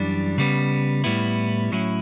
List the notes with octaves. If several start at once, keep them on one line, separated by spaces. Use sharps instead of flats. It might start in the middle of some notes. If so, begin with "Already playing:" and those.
Already playing: F#2 E3 G3 D4
C#3 G3 B3
A2 G3 B3 E4
A2 F#3 C#4 E4